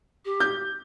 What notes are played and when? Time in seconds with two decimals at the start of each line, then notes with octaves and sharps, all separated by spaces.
0.24 G4
0.40 G6